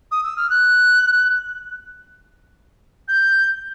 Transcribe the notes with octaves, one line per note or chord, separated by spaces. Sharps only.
D#6
E6
F6
F#6
G6